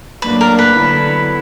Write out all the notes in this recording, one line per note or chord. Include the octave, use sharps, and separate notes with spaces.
A2 F#3 A#3 D4 B4
A#4
B4
D3 F#3 B3 E4